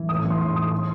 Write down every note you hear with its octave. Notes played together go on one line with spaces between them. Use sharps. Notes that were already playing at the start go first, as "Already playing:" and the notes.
Already playing: E3
A2 D#6
D#6
E3
C6
A2 C6
E3 D#6
C6